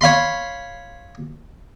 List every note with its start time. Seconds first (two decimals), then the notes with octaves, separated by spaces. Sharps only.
0.01 C#5 F5 B5 C6